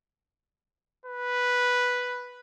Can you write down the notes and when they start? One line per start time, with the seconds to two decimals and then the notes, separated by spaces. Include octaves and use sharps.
1.06 B4